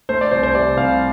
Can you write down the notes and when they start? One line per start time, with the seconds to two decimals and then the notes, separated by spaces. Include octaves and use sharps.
0.09 A3 C5
0.21 D5
0.31 C2 C5
0.43 C5
0.55 C3 D5
0.77 C2 F5